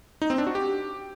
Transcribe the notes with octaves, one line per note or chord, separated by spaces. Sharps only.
D#4
C4
D4
F#4
G4